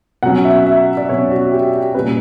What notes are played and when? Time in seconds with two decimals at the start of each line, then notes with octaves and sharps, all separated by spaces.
0.23 B2 F#3 C#4 F#5
0.45 E5
0.66 E5
0.97 D5
1.09 B2 F#3 C#4 C#5
1.31 F#4
1.52 G4
1.73 G4
1.94 A#2 G3 C#4 B4